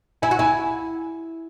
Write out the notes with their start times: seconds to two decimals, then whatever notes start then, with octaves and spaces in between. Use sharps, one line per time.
0.22 E4 G#5
0.31 F#4
0.39 E4 G#5